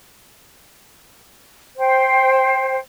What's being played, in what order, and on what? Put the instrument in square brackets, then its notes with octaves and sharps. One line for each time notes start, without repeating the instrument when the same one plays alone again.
[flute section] C5 G5